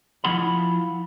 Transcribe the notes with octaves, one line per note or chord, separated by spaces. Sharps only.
F3 E4 F#5 B5